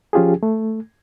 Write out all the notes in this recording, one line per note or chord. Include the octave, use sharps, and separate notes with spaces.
F3 C#4 F4 G4 G#4
A3